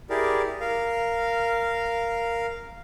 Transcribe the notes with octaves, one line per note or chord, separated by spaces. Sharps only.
E4 G4 G#4 A#4 D5
A#4 F5